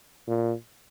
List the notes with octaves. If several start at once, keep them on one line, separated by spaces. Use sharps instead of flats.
A#2